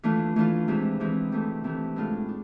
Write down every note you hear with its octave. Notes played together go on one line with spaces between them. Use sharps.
E3 A3 D4 F4
E3 A3 D4 F4
C3 E3 G#3 C4
C3 E3 G#3 C4
C3 E3 A3
C3 E3 A3
A2 G#3 D4 F4
D4